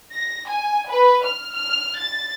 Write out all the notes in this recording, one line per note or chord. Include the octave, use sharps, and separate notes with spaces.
A#6
G#5
B4
F6
F6
A6